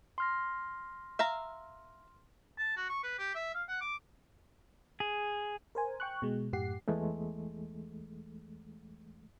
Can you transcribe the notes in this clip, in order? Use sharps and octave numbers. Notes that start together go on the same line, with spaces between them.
C6 F6 A#6
E5 F5 A#5
A5
F#4
C#6
B4
G4
E5
F5
F#5
D6
G#4
A#4 C5 G#5
G5 C#6 F#6
B2 G#3
F#2 A2 G4 F#5 C7
E2 E3 G#3 A3